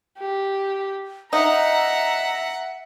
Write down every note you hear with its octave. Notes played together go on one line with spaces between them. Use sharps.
G4
D#4 E5 F#5 A#5